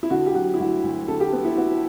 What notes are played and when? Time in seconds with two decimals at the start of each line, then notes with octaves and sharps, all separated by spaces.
0.03 E4
0.10 D3 F#4
0.26 G4
0.34 F#3 F#4
0.54 E4
0.59 D2 F#4
0.84 D2
1.08 D3 A4
1.20 G4
1.33 B3
1.45 E4
1.57 B3 F#4